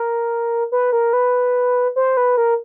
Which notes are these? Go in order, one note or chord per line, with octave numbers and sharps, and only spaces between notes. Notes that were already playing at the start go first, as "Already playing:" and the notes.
Already playing: A#4
B4
A#4
B4
C5
B4
A#4